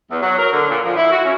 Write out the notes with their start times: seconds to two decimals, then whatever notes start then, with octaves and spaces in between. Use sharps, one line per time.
0.10 E2
0.22 F#3
0.38 A#4
0.52 D3
0.68 A#2
0.84 F3
0.96 E4
1.11 F#4
1.24 C#4